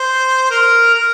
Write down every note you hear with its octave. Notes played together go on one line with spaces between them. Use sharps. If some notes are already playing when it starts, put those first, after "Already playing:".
Already playing: C5
A#4
A#4